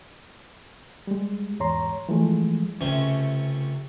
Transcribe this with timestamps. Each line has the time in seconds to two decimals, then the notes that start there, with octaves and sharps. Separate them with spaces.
1.07 G3 G#3
1.60 E2 G#2 C#5 A#5 C6
2.09 E3 F3 G#3 A3
2.81 C#2 C3 A3 C#4 C5 C#6